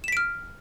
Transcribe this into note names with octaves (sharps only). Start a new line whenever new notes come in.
F6 B6 D7 E7